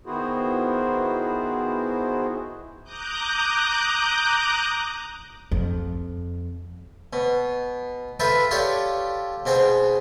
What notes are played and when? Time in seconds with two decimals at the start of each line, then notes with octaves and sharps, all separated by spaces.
0.06 D#3 B3 E4 F#4 G#4 C5
2.83 A#5 D6 D#6 F#6 G6
5.52 F2
7.13 B2
8.20 F4 A4 B4 E5 G5
8.51 F4 G4 A4 C#5 D5 G5
9.46 B2 C4 G#4 G5